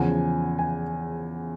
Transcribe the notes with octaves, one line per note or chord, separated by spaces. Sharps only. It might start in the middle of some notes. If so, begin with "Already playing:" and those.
Already playing: E2 C#3 F3 F#5 G#5
G#5